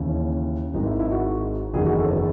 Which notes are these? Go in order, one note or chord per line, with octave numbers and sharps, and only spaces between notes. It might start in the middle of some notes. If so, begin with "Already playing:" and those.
Already playing: D#2 C#3 E3
C#4
G#1 G#2 D#3 D#4
E4
E4
F#4
F#1 E2 D#3 G#4
F#4
A4
C#5
B4